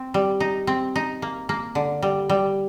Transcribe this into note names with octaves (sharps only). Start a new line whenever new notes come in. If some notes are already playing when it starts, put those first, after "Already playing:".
Already playing: C4
G3
D#4
C4
D#4
A#3
A#3
D3
G3
G3